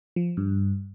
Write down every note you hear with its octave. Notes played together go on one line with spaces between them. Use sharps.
F3
G2